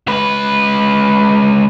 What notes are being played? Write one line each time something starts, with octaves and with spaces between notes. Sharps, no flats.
C#2 B4